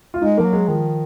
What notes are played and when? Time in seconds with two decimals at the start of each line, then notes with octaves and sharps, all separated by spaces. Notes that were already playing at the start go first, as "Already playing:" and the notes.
0.14 F4
0.22 G#3 D#4
0.38 F3 A#3
0.45 F#3
0.53 G#3
0.68 D#3 F3